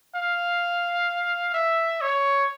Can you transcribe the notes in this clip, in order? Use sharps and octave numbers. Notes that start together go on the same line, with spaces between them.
F5
E5
C#5